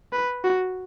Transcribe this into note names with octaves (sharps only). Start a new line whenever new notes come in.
B4
F#4